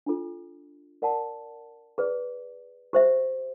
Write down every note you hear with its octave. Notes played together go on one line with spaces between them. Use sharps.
D4 F4 A4
A#4 D5 F#5 A5
G#4 B4 D5
G4 C5 E5